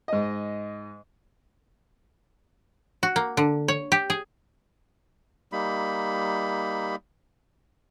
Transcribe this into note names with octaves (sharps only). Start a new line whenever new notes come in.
G#2 D#5
F#4
A#3
D3
C#5
G4
G#4
G3 A#3 D#4 B5